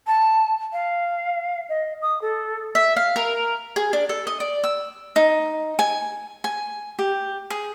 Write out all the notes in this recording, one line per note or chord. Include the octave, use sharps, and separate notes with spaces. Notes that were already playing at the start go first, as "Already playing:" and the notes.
A5
F5
D#5
D#6
A4
E5
F5
A#4
G#4
D4
A4
D#5
D5
E6
D#4
G#5
G#5
G4
G#4